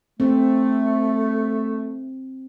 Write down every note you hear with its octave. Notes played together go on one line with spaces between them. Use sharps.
A3 C4